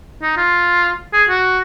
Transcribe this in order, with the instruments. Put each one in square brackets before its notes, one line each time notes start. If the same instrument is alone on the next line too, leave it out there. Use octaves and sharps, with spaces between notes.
[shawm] D#4
F4
G#4
F#4